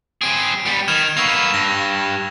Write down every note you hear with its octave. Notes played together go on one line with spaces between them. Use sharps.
C4 G#4 D7 D#7
G3 B3 C#7
D#3 F6 G#6 E7
A#3 B3 C#6 E6 F7
G2 A#6